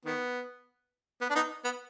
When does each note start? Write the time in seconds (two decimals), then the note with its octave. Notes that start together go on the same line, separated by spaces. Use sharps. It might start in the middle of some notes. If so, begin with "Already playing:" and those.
0.05 D#3 B3
1.21 B3
1.30 D4
1.35 B3 D#4
1.64 B3